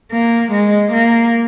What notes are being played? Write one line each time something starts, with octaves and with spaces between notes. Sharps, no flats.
A#3
G#3
A#3